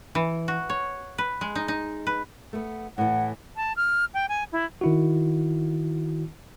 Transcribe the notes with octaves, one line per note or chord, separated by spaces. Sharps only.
E3
F#4
C#5
B4
G#3
D#4
D#4
B4
A3 B3
A2 E3 F#5
A5
F6
G5
G#5
E4
D#3 E4 F#4